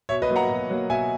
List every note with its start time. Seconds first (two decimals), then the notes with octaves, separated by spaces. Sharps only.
0.09 B2 C#5 E5
0.22 B4 D#5
0.29 F#3 A#3
0.36 F#5 A#5
0.49 B2
0.70 F#3 A#3
0.90 B2 E5 G#5